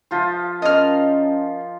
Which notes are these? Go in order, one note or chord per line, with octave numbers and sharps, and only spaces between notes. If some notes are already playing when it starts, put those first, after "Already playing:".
F3 F4 C5
C#4 A#4 D#5 F6